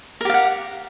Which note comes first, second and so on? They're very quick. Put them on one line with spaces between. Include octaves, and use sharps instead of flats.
A#4 G4 F5 F#5